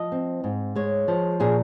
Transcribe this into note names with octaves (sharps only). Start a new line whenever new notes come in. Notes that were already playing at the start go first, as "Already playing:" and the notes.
Already playing: F3 D#5
C4
G#2
G#3 C#5
F3
A#2 G#4